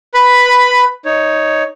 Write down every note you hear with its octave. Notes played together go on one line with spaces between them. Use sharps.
B4 B5
D#4 C#5